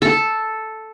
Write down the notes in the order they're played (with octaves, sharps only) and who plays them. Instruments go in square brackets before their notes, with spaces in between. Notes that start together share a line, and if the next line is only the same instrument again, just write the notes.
[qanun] A4